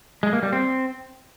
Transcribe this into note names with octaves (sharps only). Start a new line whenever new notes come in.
G#3
A#3
G3
C4